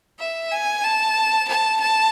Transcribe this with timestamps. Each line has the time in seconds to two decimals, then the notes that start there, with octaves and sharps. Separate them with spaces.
0.19 E5
0.52 G#5
0.84 A5
1.48 A5
1.81 A5